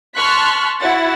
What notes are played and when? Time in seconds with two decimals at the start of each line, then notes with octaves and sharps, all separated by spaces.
0.15 A5 C6 C#6 F6 F#6 B6
0.81 E4 F#4 F#5 A6